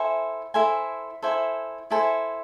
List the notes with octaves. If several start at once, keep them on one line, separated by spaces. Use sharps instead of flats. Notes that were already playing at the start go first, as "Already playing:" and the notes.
Already playing: E4 A4 C5 G#5
E4 A4 C5 G#5
E4 A4 C5 G#5
E4 A4 C5 G#5